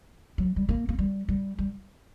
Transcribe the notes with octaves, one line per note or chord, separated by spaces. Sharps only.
F#3
G3
A#3
A#3
G3
G3
G3